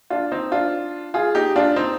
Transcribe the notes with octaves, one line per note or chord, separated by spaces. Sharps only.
D4 F4
C4 D#4
D4 F4
F4 G#4
D#4 G4
D4 F4
C4 D#4